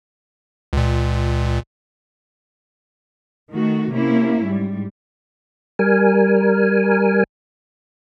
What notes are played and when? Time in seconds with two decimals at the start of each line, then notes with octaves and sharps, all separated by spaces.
0.73 C#2 A#2
3.51 D#3 A3 F#4
3.91 C3 A#3 C#4 E4
4.43 G#2 G3
5.79 G3 A#4 G#5